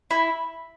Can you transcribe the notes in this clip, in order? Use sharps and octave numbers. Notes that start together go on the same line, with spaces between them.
E4